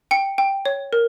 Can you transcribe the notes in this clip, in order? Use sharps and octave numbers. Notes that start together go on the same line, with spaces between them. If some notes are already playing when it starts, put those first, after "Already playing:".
G5 C#7
G5
C#5
A#4